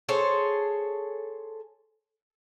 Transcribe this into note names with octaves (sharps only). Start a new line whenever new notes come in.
G#4 A4 C5 C#5